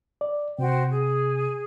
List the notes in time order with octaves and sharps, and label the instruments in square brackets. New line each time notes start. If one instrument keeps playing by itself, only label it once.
[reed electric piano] D5
[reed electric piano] C3 [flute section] F#4 C5 G5
[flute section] G#4